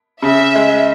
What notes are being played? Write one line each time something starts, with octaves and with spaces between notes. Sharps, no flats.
C#3 E5
G#3